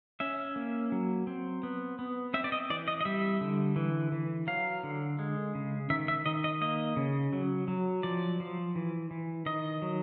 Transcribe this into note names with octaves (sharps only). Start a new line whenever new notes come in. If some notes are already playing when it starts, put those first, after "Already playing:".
C#4 E5
A#3
F#3
C4
B3
B3
C4 E5
D5
D#5
E3 D5
D#5
D#5
G3 E5
D3
E3
E3
F#3 F5
D3
G#3
C#3
D#3 E5
E5
D#3 D#5
D#5
A#3 D#5
C#3
F#3
F#3
F3 D5
F3
E3
E3
D#3 D#5
F#3